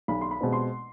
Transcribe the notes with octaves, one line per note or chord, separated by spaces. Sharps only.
B1 B5
C6
B5
B2 G#3 C4
C6